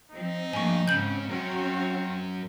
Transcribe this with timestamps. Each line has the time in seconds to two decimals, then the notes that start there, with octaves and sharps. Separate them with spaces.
0.12 F3 C4 D#4
0.53 G2 F3 A3 A#3 G#5 C#6
0.88 G#2 C#3 C4 C#4 G6 F#7
1.29 F#2 C4 C#4 F#4 C#5